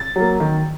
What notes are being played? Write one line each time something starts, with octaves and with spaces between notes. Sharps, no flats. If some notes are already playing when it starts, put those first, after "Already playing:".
Already playing: A6
F#3 A#3
D#3